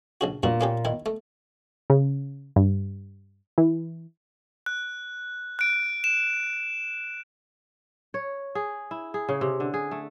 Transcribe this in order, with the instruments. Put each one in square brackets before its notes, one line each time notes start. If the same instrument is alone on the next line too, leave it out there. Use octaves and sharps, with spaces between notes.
[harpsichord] A#1 C#3 F#4
[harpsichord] G2 F#4 [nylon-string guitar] A#2
[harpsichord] A#3 C#4 G4
D#3 E4
A3
[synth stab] C#3
G2
E3
[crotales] F#6
F#6 D7
E7
[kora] C#5
G#4
E4
G#4
C#3
C3
D3
G#4
A3